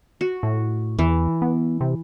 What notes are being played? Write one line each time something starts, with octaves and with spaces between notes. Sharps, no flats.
F#4
A2
E2 E3
B3
C3